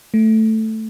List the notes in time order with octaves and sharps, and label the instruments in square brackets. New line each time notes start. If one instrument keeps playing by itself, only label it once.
[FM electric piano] A3